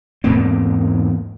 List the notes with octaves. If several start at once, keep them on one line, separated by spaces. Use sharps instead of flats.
E2 G#2 A#3 C4